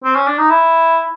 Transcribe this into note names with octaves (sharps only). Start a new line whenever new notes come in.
C4
C#4
D4
D#4
E4